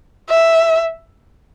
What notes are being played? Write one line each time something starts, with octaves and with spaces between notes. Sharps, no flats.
E5